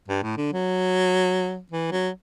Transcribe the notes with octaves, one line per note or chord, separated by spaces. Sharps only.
G2
A2
D3
F#3
E3
F#3